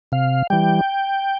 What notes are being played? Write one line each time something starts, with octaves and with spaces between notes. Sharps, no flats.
C3 F5
E3 G3 G5